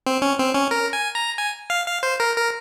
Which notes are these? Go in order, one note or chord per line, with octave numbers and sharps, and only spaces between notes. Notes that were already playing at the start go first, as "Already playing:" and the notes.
C4
C#4
C4
C#4
A#4
G#5
A#5
G#5
F5
F5
C5
A#4
A#4